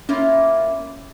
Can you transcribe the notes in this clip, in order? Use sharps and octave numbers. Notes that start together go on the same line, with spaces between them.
A#3 C#4 E4 F4